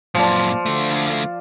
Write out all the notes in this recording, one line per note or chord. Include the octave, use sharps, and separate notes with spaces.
F#2 A#2 F3 D5
D3 A3